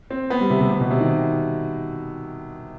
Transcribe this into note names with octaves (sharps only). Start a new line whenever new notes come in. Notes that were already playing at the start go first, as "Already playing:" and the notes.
C4
B3
G3
C3
C3
C3
B2
C3
D#3